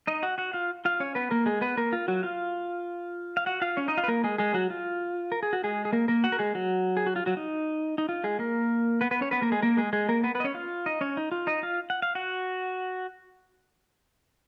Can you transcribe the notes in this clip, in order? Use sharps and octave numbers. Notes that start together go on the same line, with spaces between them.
D#4 D#5
F#4 F#5
F#4 F#5
F4 F5
F4 F5
C#4 C#5
B3 B4
A#3 A#4
G#3 G#4
B3 B4
A#3 A#4
F4
F#3 F#4
F4 F5
F5
F#4 F#5
F4 F5
C#4 C#5
D#4 D#5
F4 F5
B4
A#3 A#4
G#3 G#4
G#3 G#4
F#3 F#4
F4
A#4
G#4
F#4
G#3 G#4
G#4
A#3 A#4
A#3 A#4
F#4 F#5
A#4
G#3 G#4
F#3 F#4
G#4
F#4
F4
F#3 F#4
D#4
D#4
F4
G#3 G#4
A#3 A#4
B3 B4
B3 B4
C#4 C#5
B3 B4
A#3 A#4
G#3 G#4
A#3 A#4
G#3 G#4
G#3 G#4
A#3 A#4
B3 B4
B3 B4
D#5
C#4 C#5
F4 F5
D#4 D#5
C#4 C#5
D#4
F4
D#4 D#5
F4 F5
F#5
F5
F#4 F#5